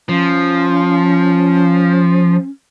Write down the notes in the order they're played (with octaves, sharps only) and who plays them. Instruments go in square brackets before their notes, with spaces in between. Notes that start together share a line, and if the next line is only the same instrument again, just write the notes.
[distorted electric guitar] F3 [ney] C#4